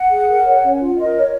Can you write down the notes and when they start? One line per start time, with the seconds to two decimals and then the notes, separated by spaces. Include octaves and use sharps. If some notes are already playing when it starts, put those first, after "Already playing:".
Already playing: F#5
0.10 G#4
0.29 A#4
0.46 C#5
0.63 C#4
0.80 F4
0.98 A#4 D#5
1.15 C#5